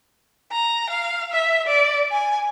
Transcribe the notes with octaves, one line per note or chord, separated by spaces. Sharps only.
A#5
F5
E5
D5
G#5